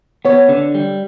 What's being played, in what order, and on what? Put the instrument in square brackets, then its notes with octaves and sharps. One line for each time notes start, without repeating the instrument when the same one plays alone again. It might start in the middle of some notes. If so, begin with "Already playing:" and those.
[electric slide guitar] B3 [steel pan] C#5
[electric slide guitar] D3
G3